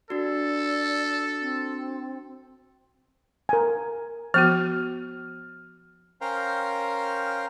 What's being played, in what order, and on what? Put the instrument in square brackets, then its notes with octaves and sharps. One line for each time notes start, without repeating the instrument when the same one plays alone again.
[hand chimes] D4 F#4 [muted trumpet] A4 [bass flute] D5
[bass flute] C4
[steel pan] A#4 G#5
[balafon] F3 B3 F#4 [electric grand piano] F6
[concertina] C#4 A#4 C5 F5 G5 A#5